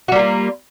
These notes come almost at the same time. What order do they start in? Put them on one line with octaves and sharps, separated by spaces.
F#4 G3 A#3 F4